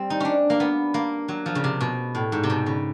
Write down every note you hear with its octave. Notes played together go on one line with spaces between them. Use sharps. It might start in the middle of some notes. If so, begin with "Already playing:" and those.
Already playing: G3 C4
D#4
C#4 D4
A#3
B3
A#3
F#3
F3
C#3
C3
B2
A2
G#2
C3
B2
C#3